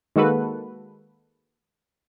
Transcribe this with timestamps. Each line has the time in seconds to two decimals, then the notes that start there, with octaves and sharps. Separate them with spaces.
0.16 D#3 G#3 A#3 F#4 A4 B4